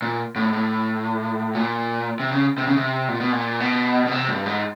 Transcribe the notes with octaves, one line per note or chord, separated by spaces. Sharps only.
A#2
A2
A2
A#2
C3
C#3
C3
C#3
C3
A#2
B2
A#2
B2
B2
C3
G2
G#2